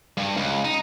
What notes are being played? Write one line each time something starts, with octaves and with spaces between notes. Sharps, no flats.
G2
C#2
D#4